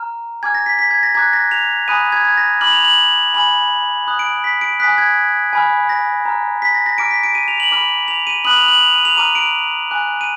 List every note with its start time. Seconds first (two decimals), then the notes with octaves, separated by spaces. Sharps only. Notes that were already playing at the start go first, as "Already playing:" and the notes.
Already playing: A#5 F6
0.43 G#5 D6 F6 G#6
0.55 A#6
0.66 B6
0.79 B6
0.91 G#6
1.03 A#6
1.15 A#5 D6 F#6 G#6
1.33 A#6
1.51 F7
1.88 G#5 B5 D#6 F#6 D#7
2.12 G#6
2.25 G#6
2.37 A#6
2.61 B5 D6 F6 F#7
2.72 F7
2.85 F#7
3.34 G#5 B5 D6 F6 F#7
4.07 B5 D#6 F#6
4.19 D7
4.44 B6
4.61 D7
4.80 G#5 D#6 F#6 B6
4.98 G#6
5.53 G#5 B5 F6
5.89 A#6
6.25 A#5 F6
6.62 B6
6.74 A#6
6.86 A#6
6.98 A#5 D6 F6 D7
7.11 B6
7.23 D7
7.35 D#7
7.48 F7
7.60 F#7
7.72 B5 D6 F6
8.08 F7
8.27 D#7
8.45 B5 D#6 F#6 F#7
8.56 F7
8.68 F#7
8.81 F7
8.93 D#7
9.05 F7
9.17 A#5 D6 F6 D#7
9.35 D7
9.90 G#5 D6 F#6
10.21 D#7